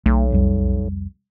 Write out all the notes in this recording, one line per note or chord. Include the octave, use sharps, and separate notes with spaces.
B1 A3
C2 F2 G3